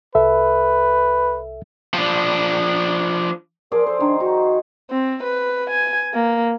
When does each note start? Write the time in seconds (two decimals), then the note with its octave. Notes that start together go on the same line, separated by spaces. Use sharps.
0.15 C2 A4 B4 E5
1.94 F3 D4
3.72 F3 G#4 A#4 D5
3.86 A4 C5
4.00 D#3 D4
4.20 D#4 F#4
4.91 C4
5.24 B4
5.70 G#5
6.14 A#3